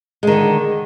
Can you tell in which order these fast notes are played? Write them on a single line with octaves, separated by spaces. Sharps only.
G#3 D#3 D3